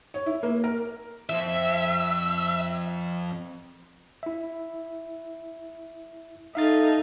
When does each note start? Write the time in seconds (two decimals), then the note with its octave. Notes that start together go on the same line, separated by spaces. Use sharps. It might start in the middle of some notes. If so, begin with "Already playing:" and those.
0.14 C#5
0.26 E4
0.43 A#3
0.64 A#4
1.29 F3 C4 E5
4.23 E4 E5
6.55 D#4 A4 E5 F5 A6